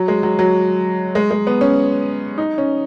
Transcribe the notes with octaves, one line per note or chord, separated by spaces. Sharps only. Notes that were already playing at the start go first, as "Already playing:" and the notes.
Already playing: F#3
G#3
F#3
F#3
G#3
G#3
B3
C#4
D#4
C#4